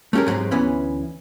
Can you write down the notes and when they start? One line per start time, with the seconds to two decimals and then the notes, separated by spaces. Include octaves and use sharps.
0.13 A3 C#4 G4 G#4 A#4
0.26 G#2 F#3 G#3 C4 G4
0.51 D2 E3 B3 C#4